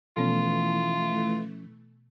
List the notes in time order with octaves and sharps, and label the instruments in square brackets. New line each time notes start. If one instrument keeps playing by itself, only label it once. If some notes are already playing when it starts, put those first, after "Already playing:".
[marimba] B2 B3 [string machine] E3 A3 [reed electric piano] F3 C#4 [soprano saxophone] F4